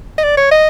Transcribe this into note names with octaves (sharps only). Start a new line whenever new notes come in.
D#5
D5
C#5
D#5